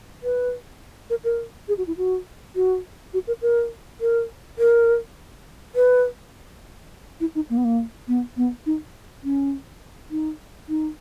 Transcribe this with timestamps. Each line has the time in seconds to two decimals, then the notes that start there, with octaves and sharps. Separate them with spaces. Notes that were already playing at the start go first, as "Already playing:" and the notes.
0.23 B4
1.10 A#4
1.24 A#4
1.68 G#4
1.78 F#4
1.87 E4
1.97 F#4
2.56 F#4
3.14 F#4
3.27 A#4
3.42 A#4
4.01 A#4
4.58 A#4
5.75 B4
7.20 E4
7.35 D#4
7.50 A#3
7.57 B3
7.65 A#3
8.08 B3
8.37 B3
8.66 D#4
9.24 C#4
10.11 D#4
10.69 D#4